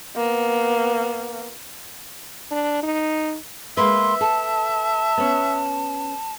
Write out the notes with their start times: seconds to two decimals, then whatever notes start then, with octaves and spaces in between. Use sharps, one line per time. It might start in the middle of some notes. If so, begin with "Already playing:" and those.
0.16 A#3 B3
2.51 D4
2.83 D#4
3.77 G#3 A#3 B4 E5 C6
4.21 A4 A5
5.18 B3 C#4